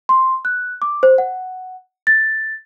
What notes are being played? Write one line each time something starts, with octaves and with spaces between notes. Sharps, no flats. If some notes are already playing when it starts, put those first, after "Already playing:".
C6
F#6
D6
C5
F#5
A6